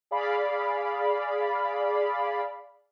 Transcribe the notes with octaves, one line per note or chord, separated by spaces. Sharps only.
G#4 D5 F5 B5